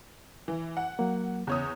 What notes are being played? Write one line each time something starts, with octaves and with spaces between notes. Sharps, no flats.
E3
F#5
F#3 A#3
E2 C#3 C#5 D#6